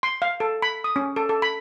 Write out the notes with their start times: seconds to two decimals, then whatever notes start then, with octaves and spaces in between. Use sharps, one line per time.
0.03 C6
0.22 F5
0.40 A4
0.62 B5
0.84 D#6
0.96 C#4
1.16 A4
1.29 A4
1.42 B5